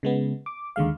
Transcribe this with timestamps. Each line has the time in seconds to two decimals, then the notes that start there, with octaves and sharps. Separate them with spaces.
0.03 C#3 G#3 B3
0.46 D6
0.76 D#2 D3 G#3 F5